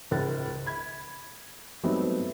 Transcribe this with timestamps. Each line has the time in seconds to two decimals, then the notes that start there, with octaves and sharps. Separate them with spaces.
0.11 C#2 G#2 A#4 F#6 A6
0.66 B5 G#6
1.83 F#3 G3 A3 B3 C4 D#4